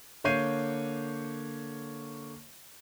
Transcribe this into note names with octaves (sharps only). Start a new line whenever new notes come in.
D3 A#3 C#5 G6 C7 D#7